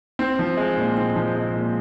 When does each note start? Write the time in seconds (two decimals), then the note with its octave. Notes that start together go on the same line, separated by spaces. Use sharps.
0.19 C4
0.39 F3
0.57 G#3
0.77 A#2
0.97 C4
1.16 F3
1.36 G#3
1.56 A#2